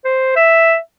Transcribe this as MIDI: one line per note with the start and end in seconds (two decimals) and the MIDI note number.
0.05 0.32 72
0.36 0.76 76